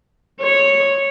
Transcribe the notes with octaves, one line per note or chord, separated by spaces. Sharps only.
C#5